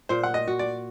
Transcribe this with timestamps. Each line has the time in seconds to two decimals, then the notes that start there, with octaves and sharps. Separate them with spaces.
0.09 A#2 C5
0.23 F#5
0.34 D#5
0.48 F#4
0.59 D5